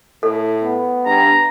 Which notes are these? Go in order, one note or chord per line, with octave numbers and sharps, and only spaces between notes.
A2 A4
B3
G2 A#5